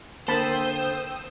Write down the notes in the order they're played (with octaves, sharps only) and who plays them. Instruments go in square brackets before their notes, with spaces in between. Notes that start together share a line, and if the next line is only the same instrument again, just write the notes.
[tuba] D3 [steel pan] A#3 A5 B5 [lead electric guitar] C5 [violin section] G5 D#6 E6